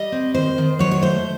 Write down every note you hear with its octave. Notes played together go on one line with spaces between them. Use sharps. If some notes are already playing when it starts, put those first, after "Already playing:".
Already playing: G3 D#5
C4
D#3 C5
D#3
F#3 C#5
C#5
A3 C5